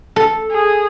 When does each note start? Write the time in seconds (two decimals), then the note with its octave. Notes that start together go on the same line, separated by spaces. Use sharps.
0.16 A4
0.52 G#4